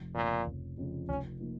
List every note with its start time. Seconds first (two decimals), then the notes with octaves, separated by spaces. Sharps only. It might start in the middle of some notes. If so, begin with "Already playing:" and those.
Already playing: F1
0.14 F2 A#2 C#3 F3 C#4
0.46 F1
0.78 F2 C#3 F3 C#4
1.09 F1 C#4
1.40 F3 A#3 D#4